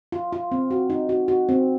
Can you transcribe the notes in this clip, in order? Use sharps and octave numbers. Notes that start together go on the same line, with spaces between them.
F4
F4
C4
F#4
D#4
F#4
F#4
C4